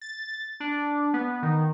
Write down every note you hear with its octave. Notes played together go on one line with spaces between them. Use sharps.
A6
D4
B3
D#3